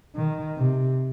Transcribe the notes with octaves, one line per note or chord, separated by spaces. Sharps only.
D#3
C3